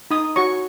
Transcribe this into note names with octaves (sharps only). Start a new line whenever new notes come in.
D#4 D#6
F#4 C#5 C#6